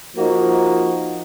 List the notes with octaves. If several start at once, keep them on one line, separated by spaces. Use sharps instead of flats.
F3 A#3 D#4 F#4